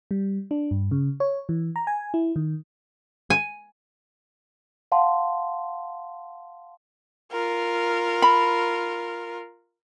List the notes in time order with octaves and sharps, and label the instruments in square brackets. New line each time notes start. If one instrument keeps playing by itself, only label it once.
[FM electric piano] G3
D4
G2
C#3
C#5
E3
A#5
G#5
E4
D#3
[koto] G#5
[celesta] F5 F#5 A5 C6
[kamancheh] F4 A#4
[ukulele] B5